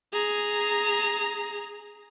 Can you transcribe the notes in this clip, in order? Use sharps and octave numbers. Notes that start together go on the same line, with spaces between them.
G#4 A#5